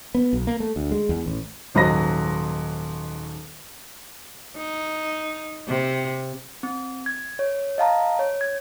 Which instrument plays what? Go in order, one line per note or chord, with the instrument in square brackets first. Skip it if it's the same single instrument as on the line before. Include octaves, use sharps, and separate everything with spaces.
[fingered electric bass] B3
B1
A#3
A3
D2
G#3
E2
A1
[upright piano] D#1 G#2 F#3 D#5 B5 A#6
[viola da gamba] D#4
C3
[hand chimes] C4
G#6
C#5
D#5 F5 A5 A#5
C#5
G#6